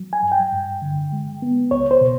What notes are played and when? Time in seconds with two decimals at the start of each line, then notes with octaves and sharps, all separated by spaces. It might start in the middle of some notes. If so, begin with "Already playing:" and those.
Already playing: F#3
0.13 G#5
0.22 G2
0.32 G5
0.52 G2
0.82 D3
1.12 G#3
1.42 B3
1.71 C#2 C#5
1.91 C5
2.01 B2